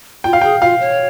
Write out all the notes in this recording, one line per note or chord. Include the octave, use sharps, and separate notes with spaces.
F4 G5
F5
G#4 G5
F4 F5
C#5